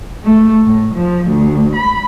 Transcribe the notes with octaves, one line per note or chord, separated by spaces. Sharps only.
A3
A2
F3
D2
B5